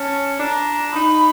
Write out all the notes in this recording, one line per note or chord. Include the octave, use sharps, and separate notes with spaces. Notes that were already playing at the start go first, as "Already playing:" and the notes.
Already playing: C#4 A5
D4 A#5
D#4 B5